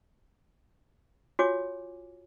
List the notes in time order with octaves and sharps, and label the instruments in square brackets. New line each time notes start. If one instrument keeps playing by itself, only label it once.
[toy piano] F4 F#4 C#5 G#5 D6